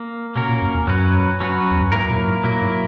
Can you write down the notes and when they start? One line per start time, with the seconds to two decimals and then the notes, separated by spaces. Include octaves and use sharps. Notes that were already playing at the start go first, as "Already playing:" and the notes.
Already playing: A#3
0.35 B2 A#3 C#4 F#4 A#4
0.49 A#2
0.62 F#2
0.75 E2
0.87 F#2 F#3 C#4 F#4 B4
1.40 F#3 C#4 F#4 B4
1.71 E2
1.81 F#2
1.92 G#2 F#3 A#3 E4 A#4
2.09 A#2
2.27 G#2
2.44 A#2 F#3 A#3 E4 A#4
2.62 G#2